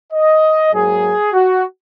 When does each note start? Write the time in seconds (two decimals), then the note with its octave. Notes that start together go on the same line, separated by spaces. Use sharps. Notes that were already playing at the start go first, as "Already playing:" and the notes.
0.12 D#5
0.72 G#2 F#3 A#3 G#4
1.32 F#4